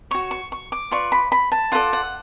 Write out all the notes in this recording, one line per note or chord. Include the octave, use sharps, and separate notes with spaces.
F#4 C#5 C#6
C#6
C#6
D6
F4 B4 D5 C#6
B5
B5
A5
F4 A4 D5 F#5
F#5